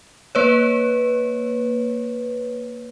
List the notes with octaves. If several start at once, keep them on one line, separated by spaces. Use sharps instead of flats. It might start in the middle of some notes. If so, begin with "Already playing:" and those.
A#3 B4 C#5